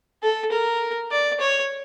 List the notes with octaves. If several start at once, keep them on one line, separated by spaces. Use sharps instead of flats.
A4
A#4
D5
C#5